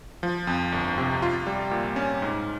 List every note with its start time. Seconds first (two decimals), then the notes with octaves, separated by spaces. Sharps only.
0.23 F3
0.47 F2
0.72 G1
0.98 C3
1.22 F4
1.47 G3
1.71 A#2
1.96 C#4
2.22 G#2